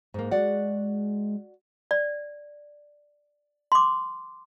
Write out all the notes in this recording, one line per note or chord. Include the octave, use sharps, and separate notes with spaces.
G#2 A#3
G#3 F#4 D5 F#5
D5
C6 D6